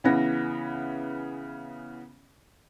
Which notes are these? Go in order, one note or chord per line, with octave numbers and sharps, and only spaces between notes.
C#3 E3 B3 A#6